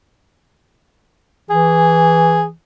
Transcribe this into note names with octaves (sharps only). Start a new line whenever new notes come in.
E3 G#4